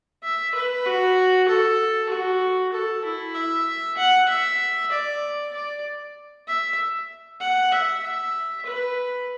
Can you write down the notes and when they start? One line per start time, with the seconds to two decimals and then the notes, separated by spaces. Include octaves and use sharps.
0.23 E5
0.55 B4
0.86 F#4
1.48 A4
2.10 F#4
2.73 A4
3.05 E4
3.35 E5
3.97 F#5
4.29 E5
4.92 D5
5.53 D5
6.48 E5
7.41 F#5
7.72 E5
8.03 E5
8.66 B4